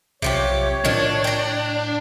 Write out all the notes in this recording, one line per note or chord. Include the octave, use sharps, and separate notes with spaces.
B1 C3 F3 G4 C#5
A2 D#3 F3 D4
G5 A#5